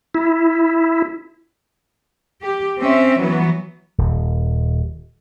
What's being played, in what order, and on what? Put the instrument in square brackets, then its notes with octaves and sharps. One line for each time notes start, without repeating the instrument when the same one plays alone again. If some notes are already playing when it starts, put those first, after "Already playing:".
[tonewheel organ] E4
[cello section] G4
C4 C#4 E5
E3 F#3 B3
[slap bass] D#1